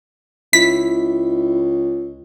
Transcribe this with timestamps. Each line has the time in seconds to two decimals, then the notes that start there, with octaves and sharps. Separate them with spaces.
0.53 C#2 E4 B6